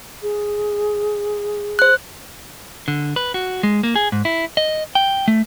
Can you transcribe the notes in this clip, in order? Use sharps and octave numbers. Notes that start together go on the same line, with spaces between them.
G#4
C5 F#6
D3
B4
F#4
G#3
A#3
G#4
G#2
E4
D#5
G5
A3